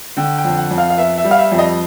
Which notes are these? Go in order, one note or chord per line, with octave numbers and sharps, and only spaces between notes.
D3 G5
G5
F2
F#5
F2
F5
F5
B3 E5
E5
G3
F5
E5
F2
D#5